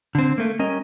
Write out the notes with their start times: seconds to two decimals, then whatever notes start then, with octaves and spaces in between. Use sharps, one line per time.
0.15 D3 C4
0.38 A3 A#3
0.59 G3 C#4 A#4 D#5